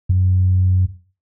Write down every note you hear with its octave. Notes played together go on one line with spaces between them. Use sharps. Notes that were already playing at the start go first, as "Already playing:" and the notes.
F#2